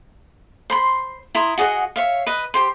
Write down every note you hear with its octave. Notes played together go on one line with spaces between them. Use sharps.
C5 B5 C6
E4 A#5 C6 D#6
F#4 G#4 D#5 F#5
C#5 E5 F5
B4 D#5
G4 C5 C6